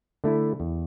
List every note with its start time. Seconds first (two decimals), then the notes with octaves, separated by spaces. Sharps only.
0.24 D3 A3 E4
0.60 E2